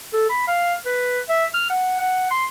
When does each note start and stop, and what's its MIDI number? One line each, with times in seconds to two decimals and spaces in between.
0.13 0.26 69
0.30 0.45 83
0.48 0.74 77
0.86 1.19 71
1.29 1.46 76
1.54 1.67 89
1.70 1.97 78
2.00 2.27 78
2.31 2.46 84